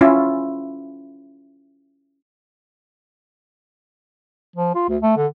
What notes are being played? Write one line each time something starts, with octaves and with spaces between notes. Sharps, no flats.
C#4 E4 F4
F3
F4
D2
A3
D3